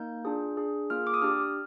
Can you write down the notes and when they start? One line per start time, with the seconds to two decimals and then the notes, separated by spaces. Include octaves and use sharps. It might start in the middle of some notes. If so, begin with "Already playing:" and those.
Already playing: A#3 D#4 G6
0.25 D4 F4 G#4
0.57 D4 G#4
0.90 A#3 F4 G#4 F6
1.07 D6
1.14 D#6
1.22 D4 G4 F6